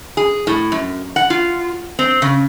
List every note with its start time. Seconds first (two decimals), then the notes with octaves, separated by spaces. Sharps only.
0.17 G#4
0.47 A2
0.72 F#2
1.16 F#5
1.30 F4
1.99 C4
2.22 C#3